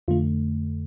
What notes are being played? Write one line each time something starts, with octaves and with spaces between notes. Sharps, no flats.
F2 D3 A3 F4